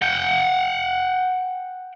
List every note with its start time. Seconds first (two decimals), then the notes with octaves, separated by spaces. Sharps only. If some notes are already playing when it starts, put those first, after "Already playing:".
0.02 F#5 G5